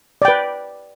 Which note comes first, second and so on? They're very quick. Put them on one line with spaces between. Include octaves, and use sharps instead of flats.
D5 G5 B4